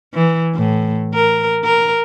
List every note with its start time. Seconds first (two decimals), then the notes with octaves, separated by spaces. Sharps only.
0.14 E3
0.54 A2
1.14 A#4
1.64 A#4